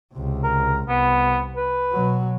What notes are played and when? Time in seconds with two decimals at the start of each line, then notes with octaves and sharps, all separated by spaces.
0.13 C#2 C3
0.43 A#4
0.89 C2 B3
1.57 B4
1.92 B2 F#3